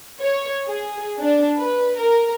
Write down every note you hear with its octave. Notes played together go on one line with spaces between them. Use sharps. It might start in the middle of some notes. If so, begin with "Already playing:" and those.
C#5
G#4
D4
B4
A#4